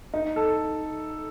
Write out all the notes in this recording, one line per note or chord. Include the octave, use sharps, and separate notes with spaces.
D#4
A4